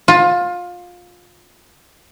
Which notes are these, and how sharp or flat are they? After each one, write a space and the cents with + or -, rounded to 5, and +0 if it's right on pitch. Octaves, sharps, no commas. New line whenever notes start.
F4 +20